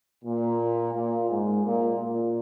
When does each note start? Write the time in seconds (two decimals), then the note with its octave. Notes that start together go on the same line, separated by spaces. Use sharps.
0.23 A#2
0.93 A#2
1.29 G#2
1.64 A#2
1.98 A#2